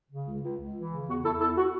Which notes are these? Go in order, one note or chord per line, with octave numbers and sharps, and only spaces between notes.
C#3
C#2
C#2
C#2
E3
C#3
E2 F#4
E2 E4 A4
E2 E4 A4
F#4